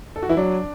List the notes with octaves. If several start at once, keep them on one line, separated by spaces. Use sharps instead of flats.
A4
F#4
E3 E4
F#3 D4